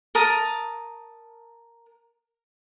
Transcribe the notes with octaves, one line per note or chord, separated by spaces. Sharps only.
A#4 A5 D#6